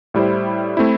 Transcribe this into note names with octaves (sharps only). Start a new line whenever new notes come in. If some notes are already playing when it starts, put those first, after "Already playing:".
A2 G3 E4 C5
A3 C4 E4